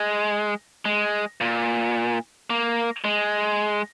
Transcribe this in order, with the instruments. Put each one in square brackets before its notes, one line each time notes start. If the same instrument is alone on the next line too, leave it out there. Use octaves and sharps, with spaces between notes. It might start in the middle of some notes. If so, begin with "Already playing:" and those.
Already playing: [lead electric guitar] G#3
G#3
A#2
A#3
G#3